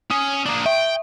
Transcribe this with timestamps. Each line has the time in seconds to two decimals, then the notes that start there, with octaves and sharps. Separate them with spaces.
0.10 C#4 D#6
0.46 A#3 D4
0.66 E5 G5